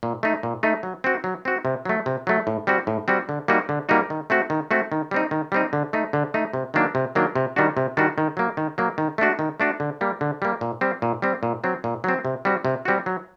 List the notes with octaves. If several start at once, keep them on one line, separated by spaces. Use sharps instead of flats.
A#2
A3 D#4
A#2
A3 D#4
F#3
C4 F#4
F#3
C4 F#4
C3
F#3 A3
C3
F#3 A3
A2
G3 C4 F#4
A2
G3 C4 F#4
D3
G3 A#3 D#4 F#4
D3
G3 A#3 D#4 F#4
D#3
A3 C4 F#4
D#3
A3 C4 F#4
D#3
G3 C4 D#4
D#3
G3 C4 D#4
D3
A3 D#4
D3
A3 D#4
C3
D#3 F#3 A#3 D4
C3
D#3 F#3 A#3 D4
C3
D#3 G3 D4 F#4
C3
D#3 G3 D4 F#4
D#3
F#3 A#3
D#3
F#3 A#3
D#3
A3 D4 F#4
D#3
A3 D4 F#4
D3
G3 A#3
D3
G3 A#3
A#2
G3 C4
A#2
G3 C4
A#2
F#3 C4
A#2
F#3 C4
C3
G3 C4 F#4
C3
G3 C4 F#4
F#3